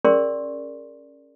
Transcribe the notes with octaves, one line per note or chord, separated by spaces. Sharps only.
C#4 G#4 A#4 D5 C6 C#6